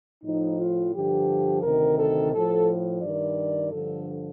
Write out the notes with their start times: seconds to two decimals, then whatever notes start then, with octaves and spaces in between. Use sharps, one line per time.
0.24 A2 F3 D#4
0.58 F4
0.94 G2 D3 F3 G4
1.63 D2 C3 D#3 A#4
1.98 A4
2.33 A2 F3 A4
3.02 G2 D#3 D5
3.71 G2 D3 F3 A4